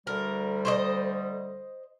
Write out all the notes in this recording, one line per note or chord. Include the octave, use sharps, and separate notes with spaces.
D2 D3 G3 A#4
C5 C#5 D#5